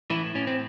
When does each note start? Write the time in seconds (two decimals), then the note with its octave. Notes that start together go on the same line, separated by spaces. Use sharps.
0.10 A2 E3 E4
0.35 A2 C#4
0.47 C4